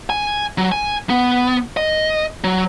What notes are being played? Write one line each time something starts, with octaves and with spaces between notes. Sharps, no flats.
G#5
F#3
G#5
B3
D#5
F#3